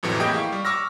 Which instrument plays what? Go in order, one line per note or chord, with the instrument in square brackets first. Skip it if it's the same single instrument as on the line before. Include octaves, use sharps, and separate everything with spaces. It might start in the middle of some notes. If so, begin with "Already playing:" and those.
[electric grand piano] F2 A2 C3 E3 F#3
A#3 E4 G4 G#4 D#5 G5
G4 F5 C#6
G3
C#6 D6 E6 F6 A#6